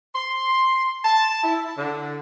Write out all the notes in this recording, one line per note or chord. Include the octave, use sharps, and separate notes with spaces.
C6
A5
E4
D3